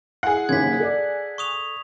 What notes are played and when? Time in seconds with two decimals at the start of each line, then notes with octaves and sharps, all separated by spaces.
0.23 E4 G#4 F#5
0.49 F#1 D#2 C#3 G#6 B6
0.80 A4 D5
1.38 C#6 D#6 F7